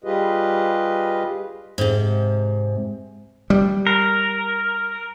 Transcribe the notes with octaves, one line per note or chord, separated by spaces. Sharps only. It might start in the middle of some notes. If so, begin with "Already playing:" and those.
G3 F4 G4 G#4 B4 D#5
G#2 C3
G3
A#4